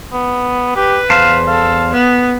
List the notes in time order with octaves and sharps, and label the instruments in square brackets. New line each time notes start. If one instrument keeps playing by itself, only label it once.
[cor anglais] B3
[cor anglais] G4 [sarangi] B4
[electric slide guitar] E2 C5 A5 [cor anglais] F5
[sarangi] A4 [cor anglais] F5
[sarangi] B3